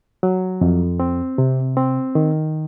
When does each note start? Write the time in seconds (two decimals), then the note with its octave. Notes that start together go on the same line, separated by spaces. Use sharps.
0.23 F#3
0.61 F2
1.00 C4
1.38 C3
1.77 C4
2.15 D#3